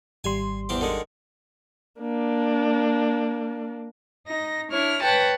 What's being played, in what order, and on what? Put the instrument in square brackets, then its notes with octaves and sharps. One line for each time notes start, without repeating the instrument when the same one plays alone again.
[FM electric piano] G#1 G3 C6 [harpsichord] G#5
[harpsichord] E2 C4 G4
D3 D#3 G#3
[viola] A#3 D4
[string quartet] D#4 A#6
D4 E4 C#5 F6
B4 C#5 F#5 G5 A5